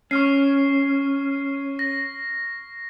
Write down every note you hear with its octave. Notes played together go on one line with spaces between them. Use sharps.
C#4 C#6 F6 C7
A#6